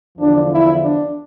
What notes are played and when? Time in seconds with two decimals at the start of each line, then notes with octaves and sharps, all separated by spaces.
0.18 E2 D3 F3 D4
0.50 E4
0.81 D4